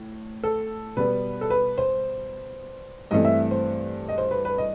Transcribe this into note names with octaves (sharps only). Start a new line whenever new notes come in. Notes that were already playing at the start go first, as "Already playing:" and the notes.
Already playing: A2
A4
B2 G3 B3 B4
A4
B4
C5
G2 E3 A3 C4 D#5
E5
C5
D#5
C5
B4
B4
D#5